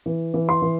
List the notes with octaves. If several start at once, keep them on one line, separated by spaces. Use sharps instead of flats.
E3
E3
C6
E3